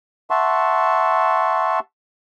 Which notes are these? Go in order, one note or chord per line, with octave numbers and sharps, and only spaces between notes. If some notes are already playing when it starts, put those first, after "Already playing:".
E5 F#5 A5 C6 C#6